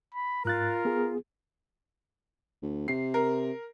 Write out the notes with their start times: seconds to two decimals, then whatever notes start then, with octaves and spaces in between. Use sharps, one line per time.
0.14 B5
0.45 G#2 F4 A#4 F#6 A6
0.85 B3 G#4
2.62 D2
2.88 C3 C7
3.14 A#4